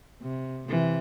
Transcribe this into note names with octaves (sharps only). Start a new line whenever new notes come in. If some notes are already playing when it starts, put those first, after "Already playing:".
C3
C3 E3